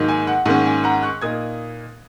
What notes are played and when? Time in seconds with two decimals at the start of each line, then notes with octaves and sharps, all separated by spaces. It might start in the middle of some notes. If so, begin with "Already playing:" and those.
Already playing: G#2 D#3 F#3 A#3 D#4
0.09 G#5
0.27 F#5
0.46 G#2 D#3 A#3 C#4 F#5
0.66 G#5
0.84 F#5 A#5
1.03 C#6 F#6
1.22 A#2 A#3 D#4 D#6 G#6